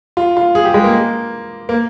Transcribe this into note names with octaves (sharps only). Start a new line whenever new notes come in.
F4
F4
G#4
G4
G#3
A#3
A#3